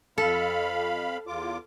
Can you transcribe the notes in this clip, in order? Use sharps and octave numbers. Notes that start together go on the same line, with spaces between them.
F2 A4 F5 B5
E2 F4 D6